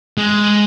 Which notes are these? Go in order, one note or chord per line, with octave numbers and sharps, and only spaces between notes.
G#3